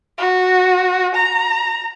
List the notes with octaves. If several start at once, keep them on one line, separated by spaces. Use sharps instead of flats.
F#4
A#5